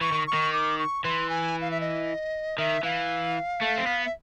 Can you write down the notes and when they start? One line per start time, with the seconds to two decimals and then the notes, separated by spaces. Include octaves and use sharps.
0.01 E3 C#6
0.12 D#3
0.27 C#6
0.34 D#3
0.53 D6
0.78 C#6
1.04 E3 C6
1.30 G#5
1.61 F5
1.71 E5
1.81 D#5
2.58 D#3 E5
2.83 E3 F5
3.61 A3
3.78 C4
3.86 B3
4.05 E5